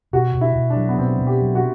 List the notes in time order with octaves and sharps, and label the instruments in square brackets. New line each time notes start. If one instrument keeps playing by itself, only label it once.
[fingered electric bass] B2 [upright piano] F#4
[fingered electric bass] B2
[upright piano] E4
[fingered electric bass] B2
[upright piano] D4
[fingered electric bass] F#3
[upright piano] B3
[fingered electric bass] B2 [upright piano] C4
[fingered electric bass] B2
[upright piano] G4
[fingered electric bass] F#3
[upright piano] F#4